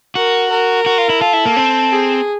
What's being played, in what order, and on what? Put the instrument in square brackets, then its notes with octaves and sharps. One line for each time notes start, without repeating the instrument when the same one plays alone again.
[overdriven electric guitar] F#4 [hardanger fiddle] A#4
[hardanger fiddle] A#4
[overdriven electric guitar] F#4
F4
E4
[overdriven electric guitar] F4 [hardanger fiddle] A4
[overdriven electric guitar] E4
A#3
C4
[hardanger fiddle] G#4